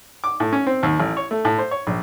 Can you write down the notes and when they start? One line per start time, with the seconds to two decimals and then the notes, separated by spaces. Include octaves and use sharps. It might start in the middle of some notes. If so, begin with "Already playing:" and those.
0.24 D6
0.40 A2
0.53 C#4
0.67 C4
0.83 D#2
1.00 A1
1.17 C#5
1.31 A3
1.45 A2
1.58 C5
1.71 C#5
1.87 A#1